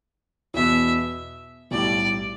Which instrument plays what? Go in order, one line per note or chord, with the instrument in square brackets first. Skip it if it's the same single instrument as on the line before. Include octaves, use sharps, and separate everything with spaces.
[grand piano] E2 B2 B3 [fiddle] E5
[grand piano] B1 A2 G3 [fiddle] D5